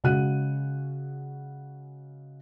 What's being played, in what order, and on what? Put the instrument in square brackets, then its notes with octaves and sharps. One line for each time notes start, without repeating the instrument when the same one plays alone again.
[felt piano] C#3 G#3 F#4 F#5 F#6 D#7